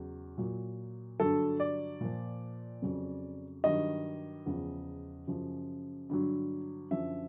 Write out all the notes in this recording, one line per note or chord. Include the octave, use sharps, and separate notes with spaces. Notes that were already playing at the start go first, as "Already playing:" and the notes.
Already playing: E2 C#3 F#3
A#2 F#3
G2 D3 F#3 A4
D5
A#2 F3
F2 C#3 F#3
G2 D#3 F#3 D#5
E2 C#3 F3
F#2 C#3 F3
G2 D3 F#3
F#2 D3 F3 E5